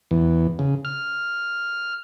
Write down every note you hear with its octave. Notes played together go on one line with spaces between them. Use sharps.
E2
C#3
F6